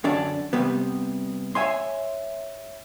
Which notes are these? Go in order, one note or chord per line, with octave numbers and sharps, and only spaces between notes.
F#2 D3 C#4 D5 A5
C3 G3 B3
C#5 E5 G#5 C6